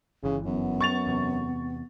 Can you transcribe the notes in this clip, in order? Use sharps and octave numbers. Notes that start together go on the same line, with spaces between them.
G1 C#3 E3
F#2 B3
C#6 A6 F7
E2 C3